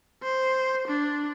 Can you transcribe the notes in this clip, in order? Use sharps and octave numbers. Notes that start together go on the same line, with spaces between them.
C5
D4